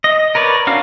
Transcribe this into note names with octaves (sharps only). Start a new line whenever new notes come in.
D#5
A#4 B4 C#5 D5
C#4 D4 F#4 F5